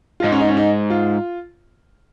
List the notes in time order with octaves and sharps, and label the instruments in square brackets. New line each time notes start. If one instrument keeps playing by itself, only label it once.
[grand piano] F4
[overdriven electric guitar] G#2 [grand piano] D#4
[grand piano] C#4
D#4
C#4
D#4
F4